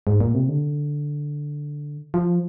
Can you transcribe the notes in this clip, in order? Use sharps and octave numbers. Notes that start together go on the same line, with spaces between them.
G#2
A#2
C3
D3
F3